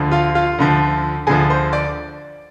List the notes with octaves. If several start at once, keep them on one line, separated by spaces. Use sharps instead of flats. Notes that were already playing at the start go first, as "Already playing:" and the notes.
Already playing: D2 D3 F3
F4 F5
F4 F5
D2 D3 F3
D2 D3 F3 G#4 G#5
C5 C6
D5 D6